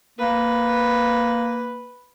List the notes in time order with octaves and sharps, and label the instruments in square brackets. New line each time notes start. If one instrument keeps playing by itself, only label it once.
[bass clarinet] A#3 [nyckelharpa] B4